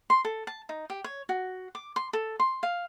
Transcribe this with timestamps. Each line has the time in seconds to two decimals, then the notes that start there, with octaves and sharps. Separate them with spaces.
0.10 C6
0.25 A4
0.47 A5
0.69 D#4
0.90 G4
1.04 C#5
1.29 F#4
1.75 D6
1.96 C6
2.13 A4
2.40 C6
2.63 F5